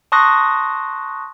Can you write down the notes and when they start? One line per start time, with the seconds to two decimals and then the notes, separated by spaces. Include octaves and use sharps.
0.12 A5 C6 C#6 D#6 F#6 A#6